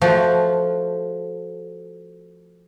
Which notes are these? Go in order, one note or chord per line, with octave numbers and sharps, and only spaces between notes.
F3 A3 F#4 F#5